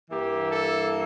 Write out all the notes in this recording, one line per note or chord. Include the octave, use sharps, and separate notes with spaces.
G2 E3 A#3 G4
A4